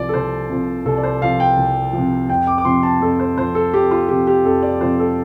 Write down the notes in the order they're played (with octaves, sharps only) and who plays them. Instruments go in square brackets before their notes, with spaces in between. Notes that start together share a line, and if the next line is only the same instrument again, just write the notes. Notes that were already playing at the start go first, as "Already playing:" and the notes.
Already playing: [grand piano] C2 C3 F3 D5
A4
C2 C5
C3 F3
C2 A4
D5
C5
C3 F3 F5
G5
C2
C3 F3
F2 G5
D6
D6
C3 F3 C6
A5
F2 A4
C5
C3 F3 C5
A4
F2 G4
F4
C3 F3 G4
G4
F2 A4
D5
C3 F3 C5
A4